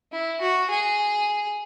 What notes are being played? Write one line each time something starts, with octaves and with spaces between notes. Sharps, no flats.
E4
F#4
G#4